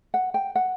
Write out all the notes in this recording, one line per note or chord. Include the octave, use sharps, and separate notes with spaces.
F#5
G5
F#5